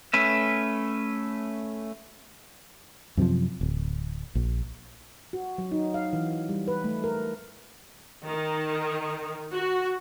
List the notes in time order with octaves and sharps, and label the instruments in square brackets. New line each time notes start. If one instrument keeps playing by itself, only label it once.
[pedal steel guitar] A3 C#4 B4 E5
[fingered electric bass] F#2 C3 D#3 F3
D1
A#1
[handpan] F#4
F#3
D#4
F5
E3
G3
B4
A3
A#4
[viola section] D#3
F#4